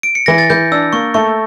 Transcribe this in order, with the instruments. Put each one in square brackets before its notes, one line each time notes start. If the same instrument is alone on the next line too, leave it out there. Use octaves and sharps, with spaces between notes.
[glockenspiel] D7
C#7
[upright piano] E3 [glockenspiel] A#6
[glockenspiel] A6
[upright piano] E3 [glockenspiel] G6
[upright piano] D4 [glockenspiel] E6
[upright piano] A#3 [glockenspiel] C#6
[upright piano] A3 [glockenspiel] C#6